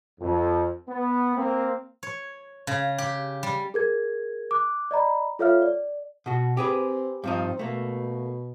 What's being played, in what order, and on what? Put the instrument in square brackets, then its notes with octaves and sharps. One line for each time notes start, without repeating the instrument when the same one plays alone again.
[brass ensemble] F2
B3
A#3 C4
[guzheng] C#5
C#3
G4
G3
[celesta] G#4 A#4 G#6
D6 F#6
D5 D#5 A#5 B5
F4 A4 C#5 E5 F5 F6
D5
[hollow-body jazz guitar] B2 F#4
[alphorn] C4 [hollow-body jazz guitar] G4 G#4 B4
[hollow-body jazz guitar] G2 F3 D#4 [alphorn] C4
[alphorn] B2 [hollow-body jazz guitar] A3 A#3